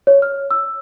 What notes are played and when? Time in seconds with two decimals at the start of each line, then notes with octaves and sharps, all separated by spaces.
0.07 C#5
0.22 F6
0.51 E6